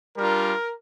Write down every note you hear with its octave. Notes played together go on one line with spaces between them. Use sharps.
G3 D4 F4 A#4